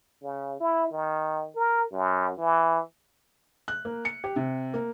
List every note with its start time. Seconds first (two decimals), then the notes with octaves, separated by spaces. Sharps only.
0.21 C#3
0.60 E4
0.92 D#3
1.56 A#4
1.92 F#2
2.38 E3
3.68 F#6
3.85 A#3
4.05 C#7
4.24 G4
4.36 C3
4.74 A#3